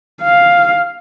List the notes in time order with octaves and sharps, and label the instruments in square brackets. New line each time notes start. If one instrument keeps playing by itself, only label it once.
[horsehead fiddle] F5